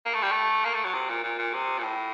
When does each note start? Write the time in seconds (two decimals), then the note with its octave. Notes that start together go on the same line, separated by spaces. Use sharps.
0.06 A#3
0.14 A3
0.23 G3
0.32 A3
0.65 A#3
0.75 A3
0.85 F#3
0.94 C3
1.10 A#2
1.24 A#2
1.39 A#2
1.54 C3
1.79 A#2
1.83 A2